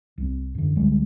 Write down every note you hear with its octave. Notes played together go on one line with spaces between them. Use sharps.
C2 C4
F#2 D3
C#2 D3 G3 G#3